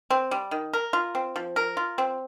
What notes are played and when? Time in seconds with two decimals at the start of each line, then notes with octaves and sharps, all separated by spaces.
0.11 C4
0.31 G3
0.51 D#3
0.73 A#4
0.93 F4
1.15 C4
1.36 F3
1.56 A#4
1.77 F4
1.98 C4